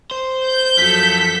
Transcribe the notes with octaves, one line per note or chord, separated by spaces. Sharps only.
C5
G6
F#2 F3 A4 B6